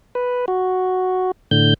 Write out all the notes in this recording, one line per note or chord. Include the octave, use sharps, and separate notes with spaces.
B4
F#4
A2 D3 G6